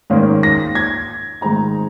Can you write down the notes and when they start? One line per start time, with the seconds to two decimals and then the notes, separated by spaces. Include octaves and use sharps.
0.10 G#2 D#3 A#3 C#4
0.43 A#6
0.75 G#6
1.41 G#2 D#3 G#3 C4 D#4 A#5